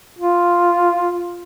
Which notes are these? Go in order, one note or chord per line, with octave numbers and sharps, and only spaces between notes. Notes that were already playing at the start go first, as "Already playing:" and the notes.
F4